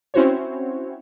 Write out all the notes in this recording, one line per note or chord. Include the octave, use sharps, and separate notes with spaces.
C4 C#4 E4 F#4 C5 C#5